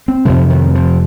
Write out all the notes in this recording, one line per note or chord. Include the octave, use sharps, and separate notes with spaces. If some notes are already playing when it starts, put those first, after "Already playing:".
C4
F2 C3 F3
D#3
F3